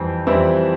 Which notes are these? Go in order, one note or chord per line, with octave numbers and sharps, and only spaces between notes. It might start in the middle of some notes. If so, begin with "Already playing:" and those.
Already playing: F2 E3 G3 C4
F2 E3 G3 C4 E4